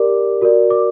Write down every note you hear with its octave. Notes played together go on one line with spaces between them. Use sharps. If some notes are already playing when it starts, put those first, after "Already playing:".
Already playing: G4 A#4 D5 D6
F#4 A#4 D5
D6